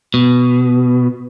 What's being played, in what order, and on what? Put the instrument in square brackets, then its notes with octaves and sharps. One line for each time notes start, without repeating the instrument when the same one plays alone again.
[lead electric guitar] B2